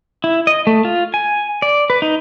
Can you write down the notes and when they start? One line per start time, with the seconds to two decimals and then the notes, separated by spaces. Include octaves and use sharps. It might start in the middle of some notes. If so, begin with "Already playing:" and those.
0.24 E4
0.47 D#5
0.67 A3
0.85 F4
1.14 G#5
1.62 D5
1.90 B4
2.02 D#4